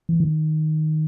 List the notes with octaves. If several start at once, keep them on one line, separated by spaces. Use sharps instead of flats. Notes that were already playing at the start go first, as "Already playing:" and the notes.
E3
D#3